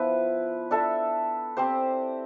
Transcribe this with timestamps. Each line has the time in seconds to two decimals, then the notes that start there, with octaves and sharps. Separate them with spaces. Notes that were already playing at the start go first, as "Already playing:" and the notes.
Already playing: F3 B3 E4 B4
0.71 D4 A4 E5
1.57 C4 G4 C5